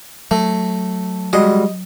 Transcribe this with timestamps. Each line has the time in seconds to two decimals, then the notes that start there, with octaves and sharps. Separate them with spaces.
0.31 F#3 A3
1.33 G3 G#3 F#4 D#5